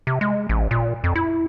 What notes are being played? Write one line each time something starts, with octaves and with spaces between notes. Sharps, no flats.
C3
G#3
A1
A#2
F2
E4